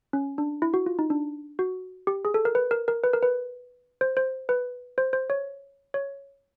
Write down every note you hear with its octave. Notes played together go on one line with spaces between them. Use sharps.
C#4
D4
E4
F#4
F4
D#4
D4
F#4
G4
G#4
A4
A#4
B4
A#4
A#4
B4
A#4
B4
C5
C5
B4
C5
C5
C#5
C#5